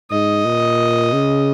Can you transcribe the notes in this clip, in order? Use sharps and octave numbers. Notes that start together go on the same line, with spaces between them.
G#2 D#5
A#2
C#3